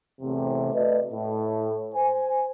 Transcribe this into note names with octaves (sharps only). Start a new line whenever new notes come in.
E2 A2 C3
A3 F#4 B4 D5 D#5
A2
C5 G#5